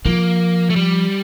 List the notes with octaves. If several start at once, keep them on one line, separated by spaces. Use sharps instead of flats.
F3 A#3
A3
G3